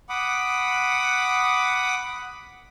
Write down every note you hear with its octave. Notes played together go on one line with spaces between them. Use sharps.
F#5 B5 D6 D#6